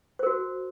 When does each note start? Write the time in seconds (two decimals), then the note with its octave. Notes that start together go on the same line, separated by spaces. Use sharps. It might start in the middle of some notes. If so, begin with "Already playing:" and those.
0.19 C5
0.23 A#4
0.27 F#4